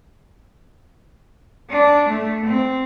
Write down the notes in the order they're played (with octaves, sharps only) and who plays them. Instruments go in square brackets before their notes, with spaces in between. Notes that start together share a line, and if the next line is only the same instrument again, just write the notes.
[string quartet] D4
A3
C4